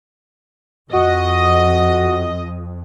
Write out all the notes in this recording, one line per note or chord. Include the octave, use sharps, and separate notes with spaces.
F2 F#4 D#5